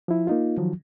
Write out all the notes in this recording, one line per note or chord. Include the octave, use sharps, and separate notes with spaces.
F3 E4
A#3 D#4 F4
D#3 F3 F#3